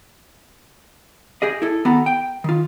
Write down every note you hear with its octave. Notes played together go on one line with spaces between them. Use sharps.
G4 G#4 D#5
E4 A4
D#3 B3 F#4 A4 F#5 A#5
G5
D#3 F4